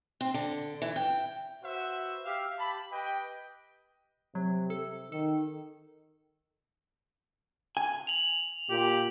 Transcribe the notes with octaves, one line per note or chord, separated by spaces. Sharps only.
C4
D3
E3
G5
F#4 B4 C5 E5 F#5
G4 E5 F5
G4 A5 B5
G4 B4 D#5 G5
C3 F#3
A4
D#3 A4
G#5
F7 F#7
A#2 G4